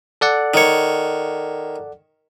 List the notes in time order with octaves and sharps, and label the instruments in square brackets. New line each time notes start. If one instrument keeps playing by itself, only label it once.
[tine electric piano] A4 D5 F#5
[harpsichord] D#3 C#5